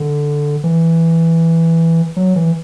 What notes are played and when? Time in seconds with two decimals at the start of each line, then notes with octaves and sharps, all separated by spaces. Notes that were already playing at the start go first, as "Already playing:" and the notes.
Already playing: D3
0.64 E3
2.16 F#3
2.36 E3